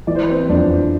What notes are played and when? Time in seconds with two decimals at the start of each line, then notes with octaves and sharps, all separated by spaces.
0.07 E3 D5
0.15 C5
0.23 B4
0.31 C4 C5
0.49 F2 D4 D5